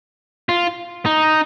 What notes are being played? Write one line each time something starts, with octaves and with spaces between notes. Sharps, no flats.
F4
D#4